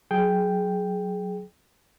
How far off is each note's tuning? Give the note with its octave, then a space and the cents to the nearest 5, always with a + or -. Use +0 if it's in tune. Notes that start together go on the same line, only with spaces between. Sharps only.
F#3 +0 G#4 +15 G5 +0